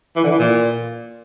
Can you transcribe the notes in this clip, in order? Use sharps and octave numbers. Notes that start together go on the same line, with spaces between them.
E3
D3
E3
A#2